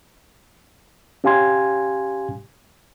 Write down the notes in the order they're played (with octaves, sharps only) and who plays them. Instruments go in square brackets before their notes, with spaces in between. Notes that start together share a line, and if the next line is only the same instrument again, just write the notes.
[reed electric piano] C#4 G4 F5 G#5 C6 G#6